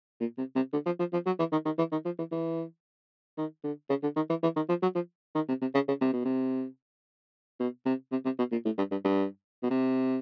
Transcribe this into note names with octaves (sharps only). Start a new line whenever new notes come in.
A#2
C3
C3
D3
F3
F3
F3
F#3
E3
D#3
D#3
E3
D#3
F3
E3
E3
D#3
D3
C#3
D3
D#3
E3
E3
D#3
F3
F#3
F3
D#3
C3
C3
C#3
C#3
C3
B2
C3
B2
C3
C3
C3
B2
A#2
A2
G2
G2
G2
B2
C3